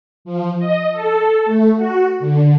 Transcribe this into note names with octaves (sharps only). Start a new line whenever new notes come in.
F3
D#5
A4
A3
F#4
D3